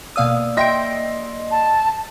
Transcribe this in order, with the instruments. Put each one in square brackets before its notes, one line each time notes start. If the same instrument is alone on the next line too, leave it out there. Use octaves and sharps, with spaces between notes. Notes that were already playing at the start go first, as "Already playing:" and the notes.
[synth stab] B2 F5 D#6 [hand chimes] A#3 D5 E6
[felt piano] D#5 C6 A#6 [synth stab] E5 G5 D7
[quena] A5